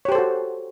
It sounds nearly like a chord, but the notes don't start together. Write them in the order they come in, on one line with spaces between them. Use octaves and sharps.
C#5 G4 C5 A4 F#4